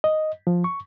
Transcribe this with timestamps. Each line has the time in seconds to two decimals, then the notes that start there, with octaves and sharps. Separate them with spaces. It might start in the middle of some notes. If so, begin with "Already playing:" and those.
0.04 D#5
0.47 F3
0.64 C#6